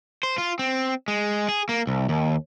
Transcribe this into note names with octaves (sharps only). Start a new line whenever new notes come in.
C5
F4
C4
G#3
G#4
A#3
C2
D#2